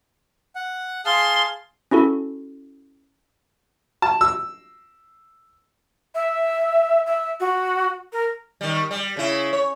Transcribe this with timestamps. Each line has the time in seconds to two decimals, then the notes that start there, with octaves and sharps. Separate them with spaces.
0.55 F#5
1.06 G#4 F5 A5 C6
1.91 C#4 E4 F#4 A4
4.02 A5
4.21 E6
6.15 E5
7.06 E5
7.40 F#4
8.13 A#4
8.61 D#3 G3
8.91 G3
9.17 C#3 E4
9.53 C#5